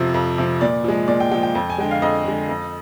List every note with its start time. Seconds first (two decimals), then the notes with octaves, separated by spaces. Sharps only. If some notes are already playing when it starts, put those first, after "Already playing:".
Already playing: F2 C3 F3
0.14 F2
0.38 C3 F3
0.61 A#2 D5
0.84 F3 G#3
1.08 A#2 D5
1.20 G5
1.32 F3 G#3 G5
1.43 G5
1.55 F2
1.70 G#5
1.78 D3 G#3 G5
1.91 F5
2.02 F2 D#5
2.25 D3 G#3
2.49 F2